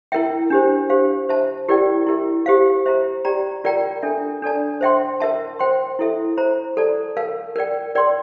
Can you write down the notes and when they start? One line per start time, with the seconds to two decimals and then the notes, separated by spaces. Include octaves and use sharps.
0.12 E4 A#4 E5 G5
0.50 D4 G4 C5
0.90 G4 C5 F5
1.29 C5 E5 A5
1.68 E4 G4 A#4 D5 G5
2.07 E4 G4 A#4 E5
2.46 G4 C5 F5
2.86 C5 E5 A#5
3.25 G4 D5 G5 A#5
3.64 F4 A#4 D5 G5 A#5
4.02 D4 A4 E5
4.42 D4 A4 D5 A5
4.81 C5 E5 G5 C6
5.20 A#4 E5 A5
5.59 C5 G5 C6
5.99 E4 A4 E5
6.37 C5 E5 A#5
6.77 A4 D5 A5
7.17 A#4 F5 A5
7.56 A#4 D5 G5
7.95 A#4 D5 G5 C6